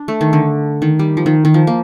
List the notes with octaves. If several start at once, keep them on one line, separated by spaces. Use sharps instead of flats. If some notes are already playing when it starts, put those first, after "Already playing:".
Already playing: D4
A3
D#3
D3
D#3
G3
F3
D#3
D#3
F3
A#3